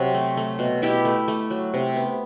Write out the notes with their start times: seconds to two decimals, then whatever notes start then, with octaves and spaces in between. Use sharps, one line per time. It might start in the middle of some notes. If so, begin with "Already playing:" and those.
Already playing: C3 F#3
0.14 A3
0.37 A3
0.59 B2
0.82 B2 E4 G4
1.05 A3
1.28 A3
1.50 F#3
1.74 C3
1.96 B3